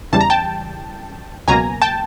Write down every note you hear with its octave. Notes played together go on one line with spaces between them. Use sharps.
E2 C#3 E3 G3 A5
A#5
G5 A5
C#2 B2 F#3 A#3 G#5 A#5
G5 A5